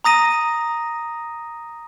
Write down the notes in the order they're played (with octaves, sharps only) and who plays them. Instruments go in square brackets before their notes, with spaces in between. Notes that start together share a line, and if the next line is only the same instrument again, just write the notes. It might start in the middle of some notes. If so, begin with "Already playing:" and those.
[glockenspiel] A#5 D#6 A#6 D#7